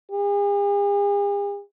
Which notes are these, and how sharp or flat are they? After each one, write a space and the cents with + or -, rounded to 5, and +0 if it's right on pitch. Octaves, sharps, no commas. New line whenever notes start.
G#4 -45